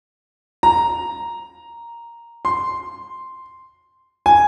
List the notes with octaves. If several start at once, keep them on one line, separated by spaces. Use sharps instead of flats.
A#5
C6
G#5